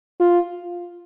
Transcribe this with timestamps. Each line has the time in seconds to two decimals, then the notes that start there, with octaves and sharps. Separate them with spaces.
0.20 F4